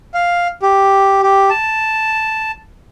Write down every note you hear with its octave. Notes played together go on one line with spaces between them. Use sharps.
F5
G4
G4
A5